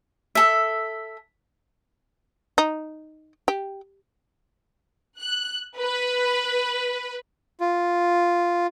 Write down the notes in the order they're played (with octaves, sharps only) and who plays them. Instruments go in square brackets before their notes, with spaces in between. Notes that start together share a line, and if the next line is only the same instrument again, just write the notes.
[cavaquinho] A4 E5
[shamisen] D#4
G4
[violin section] F#6
B4
[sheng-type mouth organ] F4